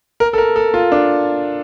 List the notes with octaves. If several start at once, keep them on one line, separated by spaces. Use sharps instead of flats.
A#4
A4
A#4
A4
F4
D4